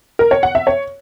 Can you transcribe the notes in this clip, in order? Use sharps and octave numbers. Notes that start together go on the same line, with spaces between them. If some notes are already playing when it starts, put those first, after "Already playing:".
A#4
C#5
F#5
E5
C#5